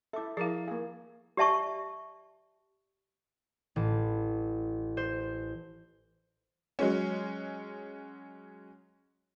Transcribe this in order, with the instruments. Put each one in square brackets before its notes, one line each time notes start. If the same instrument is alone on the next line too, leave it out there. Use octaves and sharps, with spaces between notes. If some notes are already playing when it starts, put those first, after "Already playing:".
[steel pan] E4 A4 [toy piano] E5 D6
[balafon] F3 E4 [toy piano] G#4 F5 [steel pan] A#4 A5
[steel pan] A#3 G#4 [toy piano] F5
[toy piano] G4 D5 E5 A5 C#6
[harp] A1
C5
[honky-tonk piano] F#3 G#3 C#4